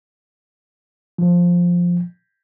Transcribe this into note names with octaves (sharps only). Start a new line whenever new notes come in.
F3